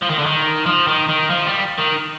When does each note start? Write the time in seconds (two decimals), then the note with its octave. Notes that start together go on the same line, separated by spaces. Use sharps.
0.03 F3
0.10 D#3
0.19 D3
0.26 D#3
0.66 F3
0.88 D#3
1.09 D#3
1.30 F3
1.46 G3
1.78 D#3